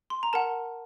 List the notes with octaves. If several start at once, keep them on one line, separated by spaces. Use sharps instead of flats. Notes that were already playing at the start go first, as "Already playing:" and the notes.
C6
A#5
A#4 F#5 A5